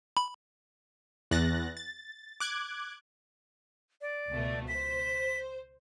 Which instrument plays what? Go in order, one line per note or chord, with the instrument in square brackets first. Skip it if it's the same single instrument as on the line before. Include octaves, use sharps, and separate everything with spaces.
[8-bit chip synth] B5
[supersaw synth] E2 F#6 A6 A#6
A6
D6 F#6 G#6
[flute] D5
[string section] C#2 B2 A3
[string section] C5 [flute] B6